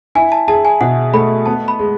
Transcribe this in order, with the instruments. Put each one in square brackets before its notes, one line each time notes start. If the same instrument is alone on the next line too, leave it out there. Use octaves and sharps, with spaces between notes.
[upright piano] E4 [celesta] G#5
[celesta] A5
[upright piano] G#4 [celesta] A5
[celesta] G#5
[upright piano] B2 [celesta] F#5
[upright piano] A3 [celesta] B5
[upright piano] B3 [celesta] A5
[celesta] B5
[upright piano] G#3